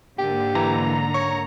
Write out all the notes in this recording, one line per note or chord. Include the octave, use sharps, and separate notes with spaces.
G#2 D3 A#3 G4
E3 A#5
C#5 C#6